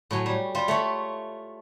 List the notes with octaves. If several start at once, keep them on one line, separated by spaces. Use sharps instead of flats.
A2 F#3 G#5
G3
G3 F4
A3 C#5 B5